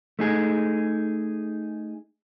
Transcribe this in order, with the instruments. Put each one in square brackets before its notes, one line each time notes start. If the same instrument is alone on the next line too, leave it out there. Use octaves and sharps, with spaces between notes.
[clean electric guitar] A3 D#4 G#4